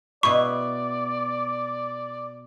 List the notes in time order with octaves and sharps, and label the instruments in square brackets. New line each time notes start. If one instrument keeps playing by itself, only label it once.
[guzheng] B2 E4 B4 [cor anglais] D5 [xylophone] C#6